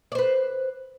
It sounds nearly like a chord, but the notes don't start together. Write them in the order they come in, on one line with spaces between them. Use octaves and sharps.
D5 C5 B4